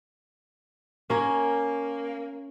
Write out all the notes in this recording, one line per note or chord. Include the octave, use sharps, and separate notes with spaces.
A#3 C#4 A#4